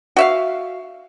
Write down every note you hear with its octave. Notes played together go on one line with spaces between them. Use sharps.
F#4 E5 F5